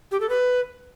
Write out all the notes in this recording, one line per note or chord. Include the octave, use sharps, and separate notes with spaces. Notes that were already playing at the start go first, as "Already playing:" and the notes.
G4
A4
B4